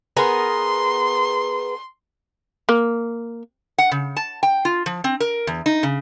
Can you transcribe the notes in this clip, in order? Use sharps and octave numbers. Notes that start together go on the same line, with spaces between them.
B3 G#4 A#4 C6
A#3
F#5
C#3
A5
G5
F4
F3
C4
A#4
E2
D#4
C#3